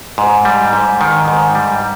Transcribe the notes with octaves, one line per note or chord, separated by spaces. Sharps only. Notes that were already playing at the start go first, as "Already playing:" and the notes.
G#2
G3
G#2
D#3
G#2
G3